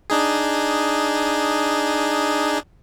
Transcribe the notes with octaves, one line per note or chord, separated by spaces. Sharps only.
D4 D#4 G#4